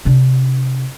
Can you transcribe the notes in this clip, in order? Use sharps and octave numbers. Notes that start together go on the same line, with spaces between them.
C3 D4